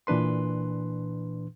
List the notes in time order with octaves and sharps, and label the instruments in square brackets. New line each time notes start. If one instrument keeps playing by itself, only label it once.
[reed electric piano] A#2 E3 D4 B4 C6